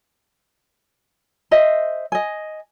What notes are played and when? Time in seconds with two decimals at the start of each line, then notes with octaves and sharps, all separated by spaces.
1.51 C5 D#5 E5
2.12 D#5 G#5